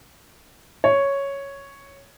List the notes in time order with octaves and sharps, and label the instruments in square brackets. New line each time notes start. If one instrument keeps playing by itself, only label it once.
[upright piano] C#5